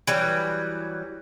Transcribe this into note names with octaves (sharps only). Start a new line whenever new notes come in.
E3 F#3 G3